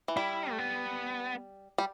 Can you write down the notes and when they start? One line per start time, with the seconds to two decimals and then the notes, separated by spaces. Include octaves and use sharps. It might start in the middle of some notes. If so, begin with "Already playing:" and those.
0.08 E3
0.17 G3 E4
0.51 A3
0.59 B3
1.78 G3